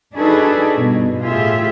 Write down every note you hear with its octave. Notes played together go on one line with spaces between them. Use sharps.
D4 D#4 F#4 G#4 A4 B4
G2 B2
A2 F4 G4 G#4 E5